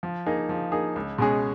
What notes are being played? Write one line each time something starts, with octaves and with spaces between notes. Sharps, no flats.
F3
A#3 D#4 G#4
F3
A#3 D#4 G#4
C#2
B2 G#3 C#4 G#4